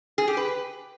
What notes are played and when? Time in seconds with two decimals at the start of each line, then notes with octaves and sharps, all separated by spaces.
0.18 G#4
0.27 G4
0.37 B4